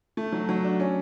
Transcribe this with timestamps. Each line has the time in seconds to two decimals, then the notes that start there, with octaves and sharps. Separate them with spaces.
0.17 A3
0.32 F#3
0.49 F#3
0.64 D4
0.80 C#4